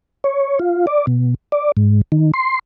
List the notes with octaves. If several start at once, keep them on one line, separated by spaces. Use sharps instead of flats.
C#5
F4
D5
B2
D5
G#2
D#3
C6